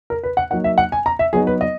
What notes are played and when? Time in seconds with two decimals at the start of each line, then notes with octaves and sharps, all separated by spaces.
0.10 A#4
0.24 B4
0.37 F#5
0.51 F#3 A#3 D#4 F#5
0.64 E5
0.78 F#5
0.92 G#5
1.06 A#5
1.19 E5
1.33 F#3 B3 D#4 G#4
1.47 B4
1.61 D#5